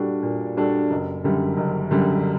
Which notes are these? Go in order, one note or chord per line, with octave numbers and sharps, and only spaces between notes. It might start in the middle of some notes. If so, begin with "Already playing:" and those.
Already playing: A#2 G3 D4 F#4 A4
A#2
G3 D4 F#4 A4
F#1
F#2 D3 G3
F#1
F#2 D3 G3